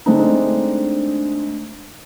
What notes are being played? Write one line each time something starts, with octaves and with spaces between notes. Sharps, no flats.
D3 G#3 A3 C4 D4 D#4